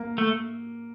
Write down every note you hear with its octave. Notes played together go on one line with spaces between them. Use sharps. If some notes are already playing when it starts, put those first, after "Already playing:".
Already playing: A#3
A3